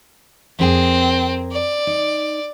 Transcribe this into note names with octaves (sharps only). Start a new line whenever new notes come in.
F2 C4 G#4 A#4
D5
D#4